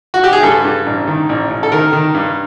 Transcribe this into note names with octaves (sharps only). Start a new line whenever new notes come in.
F#4
G4
G#4
G2 A4
G2
A1
D#3
A1
A1
A4
D#3 A#4
D#3
G2